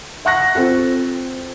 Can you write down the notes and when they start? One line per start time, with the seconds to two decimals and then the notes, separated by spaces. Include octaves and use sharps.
0.25 E5 F#5 C#6 F#6 A#6
0.55 C4 F4 A4